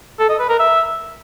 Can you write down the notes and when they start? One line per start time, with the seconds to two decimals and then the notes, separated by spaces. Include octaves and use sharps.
0.19 A4
0.29 D#5
0.39 B4
0.49 A#4
0.59 E5